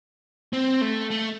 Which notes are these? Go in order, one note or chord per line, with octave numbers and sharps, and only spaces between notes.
C4
A3
A3